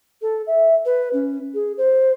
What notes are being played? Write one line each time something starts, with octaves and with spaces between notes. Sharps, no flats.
A4
E5
B4
C#4
G#4
C5